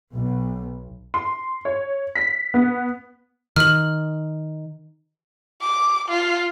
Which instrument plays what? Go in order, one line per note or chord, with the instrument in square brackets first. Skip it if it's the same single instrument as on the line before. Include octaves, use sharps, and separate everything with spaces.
[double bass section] B1
[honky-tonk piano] C6
C#5
B6
B3
[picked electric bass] D#3 [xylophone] F6 F#7
[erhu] D6
F4